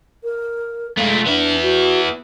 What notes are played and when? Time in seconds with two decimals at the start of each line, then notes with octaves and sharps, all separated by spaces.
0.24 A#4
0.98 G#3 A3 F4
1.27 B3 D4 E4
1.62 F#4